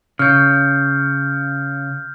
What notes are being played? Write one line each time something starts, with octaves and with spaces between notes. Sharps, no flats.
C#3 F6 G6